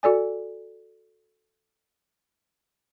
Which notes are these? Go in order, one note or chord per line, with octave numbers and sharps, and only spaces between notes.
F#4 A4 D5 G#5